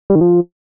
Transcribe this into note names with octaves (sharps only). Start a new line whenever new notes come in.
G3
D#3
F3